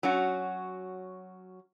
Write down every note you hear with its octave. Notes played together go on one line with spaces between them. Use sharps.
F#3 C#4 F#4